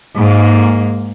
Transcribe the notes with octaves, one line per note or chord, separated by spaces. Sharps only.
G#2 A#3